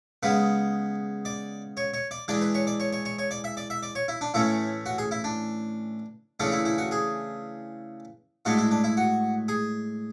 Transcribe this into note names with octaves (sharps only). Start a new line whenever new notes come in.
C#3 G#3 B3 B4
D5
C#5
C#5
D5
E3 G#3 D4 D5
B4
C#5
D5
C#5
C#5
C#5
C#5
D5
E5
D5
E5
D5
C#5
E4
D4
A2 E3 A3 C#4 E4
F#4
G#4
E4
D4
C#3 E3 A3 D4
E4
E4
F#4
G#4
A2 G#3 D4 F#4
E4
D4
E4
F#4
G#4